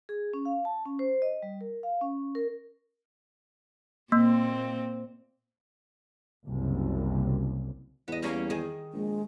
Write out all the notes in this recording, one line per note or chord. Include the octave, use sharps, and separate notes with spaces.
G#4
C#4
F5
A5
C#4
C5
D#5
G3
A#4
F5
C#4
A#4
A#2 A#3 C4
F#1 C2
E2 B3 D#5
G3 A#3 C#4
D#3 G#4
A#1 G#3